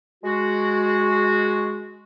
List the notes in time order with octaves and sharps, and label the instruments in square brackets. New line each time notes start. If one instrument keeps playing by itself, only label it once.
[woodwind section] G#3 F#4